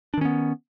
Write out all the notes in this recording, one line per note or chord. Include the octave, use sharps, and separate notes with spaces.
D#3 B3 C#4 D4